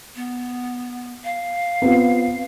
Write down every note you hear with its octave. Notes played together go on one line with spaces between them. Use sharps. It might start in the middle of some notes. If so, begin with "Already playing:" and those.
B3
F5
B3 C4 F4